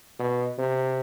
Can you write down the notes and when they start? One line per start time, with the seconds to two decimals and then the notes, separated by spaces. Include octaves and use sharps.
0.19 B2
0.58 C3